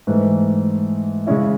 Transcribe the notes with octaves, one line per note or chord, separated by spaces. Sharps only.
G#2 E3 A3
C#3 G#3 C#4 E4